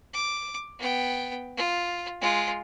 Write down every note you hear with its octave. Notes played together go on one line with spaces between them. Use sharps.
D6
B3 G5
F4
G#3 F4